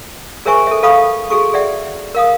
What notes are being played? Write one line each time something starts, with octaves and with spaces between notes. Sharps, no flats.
G#4 A#4 C5 E5 G#5 C#6
A4 E5
A4 B4 F5 B5 C#6 D#6
F#4 G#4 A4 C#6
G#4 D5 E5 F#5
A#4 F5 D#6